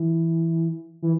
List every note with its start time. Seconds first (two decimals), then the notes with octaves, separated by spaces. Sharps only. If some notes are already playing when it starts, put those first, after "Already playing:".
Already playing: E3
1.02 E3